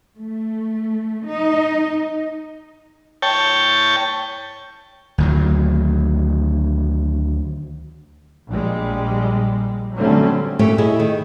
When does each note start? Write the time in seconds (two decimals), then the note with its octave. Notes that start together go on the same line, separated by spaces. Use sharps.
0.19 A3
1.26 D#4
3.22 C#5 G5 A5
5.18 D2 D#3 F#3
8.51 A#1 G3 G#3
9.97 D3 F#3 G3 A3 C4 C#4
10.59 A#2 A3 C#4 G4 C#5
10.78 E4 G#4 C#5 D#5
11.00 D#3